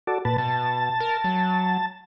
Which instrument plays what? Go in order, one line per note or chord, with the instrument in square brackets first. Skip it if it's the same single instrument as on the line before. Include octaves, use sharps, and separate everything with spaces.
[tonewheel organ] F#4 A4 D5
A#2 B4 A5
[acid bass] B2 [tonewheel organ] A5
[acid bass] A#4
F#3